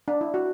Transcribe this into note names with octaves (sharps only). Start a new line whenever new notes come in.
D4
E4
F#4